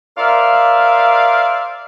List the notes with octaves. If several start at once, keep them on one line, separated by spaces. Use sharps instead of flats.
A#4 C5 D5 E5 F5